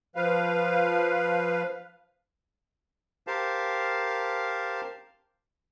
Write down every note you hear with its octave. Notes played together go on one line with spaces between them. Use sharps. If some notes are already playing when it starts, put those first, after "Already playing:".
F3 B4 F5
G4 A#4 C5 F5 A5